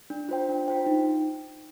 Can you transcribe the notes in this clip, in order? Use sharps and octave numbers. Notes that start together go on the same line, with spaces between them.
D4
F4 C5 G5
D4
F4 C5 G5
D#4